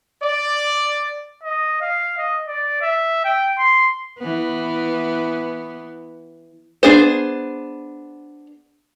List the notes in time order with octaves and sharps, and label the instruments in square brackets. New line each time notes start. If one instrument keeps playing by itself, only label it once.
[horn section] D5
[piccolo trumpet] D#5
F5
D#5
D5
E5
G5
C6
[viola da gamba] E3 B3
[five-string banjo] B3 D4 G#4 C5